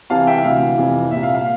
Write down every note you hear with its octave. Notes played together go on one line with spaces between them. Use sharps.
C2 C3 E3 F5 A5
E5 G5
D2 C3 E3 F5
F2 C3 E3
C2 A#2 E5
F5
F5